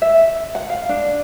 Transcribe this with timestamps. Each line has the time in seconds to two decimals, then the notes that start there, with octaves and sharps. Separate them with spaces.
0.02 E5
0.55 F#5
0.70 F5
0.89 D4